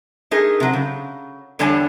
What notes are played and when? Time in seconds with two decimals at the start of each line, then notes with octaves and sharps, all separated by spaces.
0.31 A3 D#4 G#4 A#4
0.60 C3 F#3
0.73 C#3
1.59 E2 D3 G3 C#5 G#5 A5